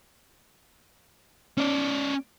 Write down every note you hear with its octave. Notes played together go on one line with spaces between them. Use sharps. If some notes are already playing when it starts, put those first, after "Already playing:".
C#4 D5